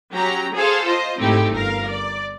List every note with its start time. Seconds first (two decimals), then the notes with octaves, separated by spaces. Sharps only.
0.14 F#3 C#4 G4 A#5
0.54 G#4 A4 C5 F5
0.86 F4 C5 D#5
1.20 G#2 A3 C4 D#4 E4 G4
1.52 G1 A#4 F5
1.87 D5